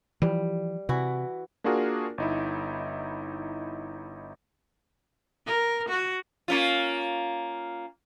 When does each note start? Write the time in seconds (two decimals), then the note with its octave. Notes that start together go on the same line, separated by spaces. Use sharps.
0.22 E3 F3 G3
0.89 C3 E3 E4 F#4
1.64 A#3 D4 F4 F#4 G#4 A#4
2.18 G1 D#4 E4
5.47 A#4
5.89 F#4
6.48 A#3 C#4 F4